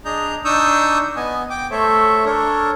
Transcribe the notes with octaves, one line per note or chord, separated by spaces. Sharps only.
D4 G#4 D#5 A#5 G6
D4 D#4 C#6 D#6 E6 G6
B3 D#5 G#5
G5 D6
A3 A4 C5 C#5 E5
D4 A4 A#4 C#5